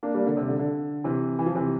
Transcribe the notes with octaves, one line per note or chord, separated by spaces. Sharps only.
A#3 D4
G3 A#3
D3
C3
D3
D3
C3 E3
E3
F3
C3 E3